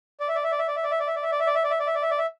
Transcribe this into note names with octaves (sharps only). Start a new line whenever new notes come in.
D5
E5
D5
E5
D5
E5
D5
E5
D5
E5
D5
E5
D5
E5
D5
E5
D5
E5
D5
E5
D5
E5
D5
E5
D5
E5